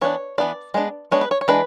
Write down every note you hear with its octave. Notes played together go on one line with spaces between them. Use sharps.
E3 B3 D4 C#5
E3 B3 D4 D5
G#3 B3 D4
G#3 B3 D4 C#5
B4
C#5
C#5
E3 G#3 D4 B4